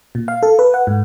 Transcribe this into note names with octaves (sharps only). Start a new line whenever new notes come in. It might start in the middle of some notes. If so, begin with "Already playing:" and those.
A#2
F5
A4
B4
F#5
G#2